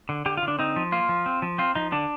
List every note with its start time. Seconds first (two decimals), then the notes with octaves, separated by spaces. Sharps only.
0.09 D3
0.26 D3 G4
0.37 F4
0.42 D3
0.48 D4
0.59 C4 D#4
0.76 F3
0.92 A#3 F4
1.09 F3
1.26 C4
1.42 F3
1.58 C4 F4
1.75 F3 D#4
1.92 D3 D4